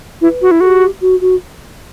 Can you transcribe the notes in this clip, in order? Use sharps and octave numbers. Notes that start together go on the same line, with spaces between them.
E4 B4
F#4
E4
F#4 A4
G4
F#4
F#4